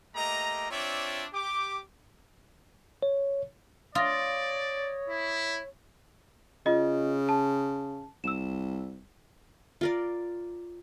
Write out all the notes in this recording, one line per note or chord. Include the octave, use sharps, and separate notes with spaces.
A3 A#3 G4 D#5 A#5
C4 D4 F4 C#5 D5 E5
G4 D6
C#5
F4 C#5 D5 D#6 A#6
E4
C#3 F4 D#5
A5
C2 E6 E7
F4 A#4 D5